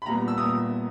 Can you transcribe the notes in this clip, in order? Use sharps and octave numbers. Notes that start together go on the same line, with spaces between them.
B5
A#2 G3 B3 A#5
E6
A#2 G3 B3 D#6